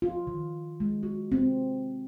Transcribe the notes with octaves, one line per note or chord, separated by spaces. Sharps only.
F4
D#3
G#3
F#4
C4